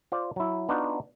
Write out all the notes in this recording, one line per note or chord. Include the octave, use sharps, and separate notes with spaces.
F4 C5 D5
F#3 E4
B3 D4 D#4 F4 F#4